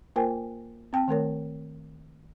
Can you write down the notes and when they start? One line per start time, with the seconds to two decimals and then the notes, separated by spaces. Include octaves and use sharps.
0.16 A#3 F4 A#4 C5 G5 G#5
0.93 C4 G5 A5
1.08 D#3 A3 A#4 C#5